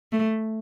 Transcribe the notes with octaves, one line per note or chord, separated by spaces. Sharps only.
A3